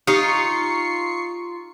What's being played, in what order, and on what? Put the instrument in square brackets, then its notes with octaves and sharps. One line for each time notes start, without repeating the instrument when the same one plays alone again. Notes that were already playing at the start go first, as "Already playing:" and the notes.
[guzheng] D#4 [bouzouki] F4 [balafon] G4 [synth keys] C#6 C7 C#7